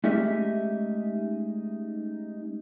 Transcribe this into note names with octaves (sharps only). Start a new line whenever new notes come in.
G#3 A3 C#4 D#4 G4 E5